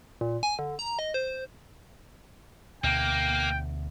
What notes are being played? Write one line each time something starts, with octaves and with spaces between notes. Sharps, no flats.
A#2
G#5
D3
A#5
D#5
C5
D2 B2 A#3 G5